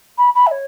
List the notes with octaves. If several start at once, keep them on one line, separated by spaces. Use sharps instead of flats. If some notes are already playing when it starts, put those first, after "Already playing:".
B5
B5
E5
C#5